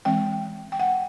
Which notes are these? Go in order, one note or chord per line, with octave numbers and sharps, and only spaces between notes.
E3 G#3 C4 G5
G5
F#5